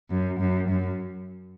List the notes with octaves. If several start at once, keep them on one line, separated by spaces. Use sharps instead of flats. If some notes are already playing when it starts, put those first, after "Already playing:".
F#2
F#2
F#2